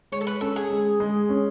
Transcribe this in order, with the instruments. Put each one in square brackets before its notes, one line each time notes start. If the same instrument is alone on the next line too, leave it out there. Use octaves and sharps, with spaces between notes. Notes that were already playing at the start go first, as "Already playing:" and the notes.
[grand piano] G#3 [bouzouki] C#5
[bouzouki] A4
B4
[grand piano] C#4 [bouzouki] A4
[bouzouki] G#4
[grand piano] G#3
G#3
C#4